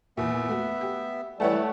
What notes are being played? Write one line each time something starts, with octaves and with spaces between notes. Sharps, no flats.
E2 A#2 B3 E5
A3 F#4
G4
E3 G3 A3 C#5 F#5 A5